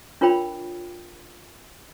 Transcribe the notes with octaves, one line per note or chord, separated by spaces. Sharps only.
D4 F4 A#4 C#5 G5 B5